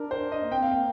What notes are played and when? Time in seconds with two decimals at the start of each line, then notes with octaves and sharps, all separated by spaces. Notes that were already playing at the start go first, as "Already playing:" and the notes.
Already playing: D4 A#4
0.11 C5
0.32 D#5
0.43 A#3
0.52 C4 G5
0.63 F5
0.71 A#3 G5